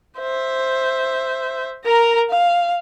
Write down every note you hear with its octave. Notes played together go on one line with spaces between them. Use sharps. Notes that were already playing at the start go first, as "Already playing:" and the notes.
C5 E5
A#4 A#5
F5